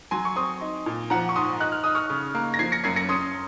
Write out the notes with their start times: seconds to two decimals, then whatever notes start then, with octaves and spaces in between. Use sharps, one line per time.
0.11 F#3 G#5 C6
0.25 C#6
0.36 C4 C6 D#6
0.61 D#4
0.86 A#2
1.10 F3 F#5 A#5
1.29 C#6
1.36 G#2 C6 D#6
1.60 D#4 F#6
1.72 F6
1.84 D#4 D#6
1.95 C#6 F6
2.10 C#3
2.35 A#3
2.54 A#6
2.59 F3 G#6 C7
2.72 A#6 C#7
2.84 F#2 G#6 C7
2.96 A#6 C#7
3.09 C#4 C6 D#6